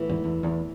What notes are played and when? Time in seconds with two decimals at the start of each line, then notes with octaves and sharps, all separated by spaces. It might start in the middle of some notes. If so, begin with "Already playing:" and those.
Already playing: A2 E3 B3
0.09 E2 G#2
0.24 E2
0.43 E2